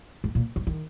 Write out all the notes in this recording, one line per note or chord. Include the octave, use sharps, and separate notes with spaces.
G#2
A#2
D#3
D#3